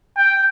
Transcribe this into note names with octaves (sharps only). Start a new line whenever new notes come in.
G5